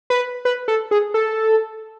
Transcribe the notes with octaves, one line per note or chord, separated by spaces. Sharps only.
B4
B4
A4
G#4
A4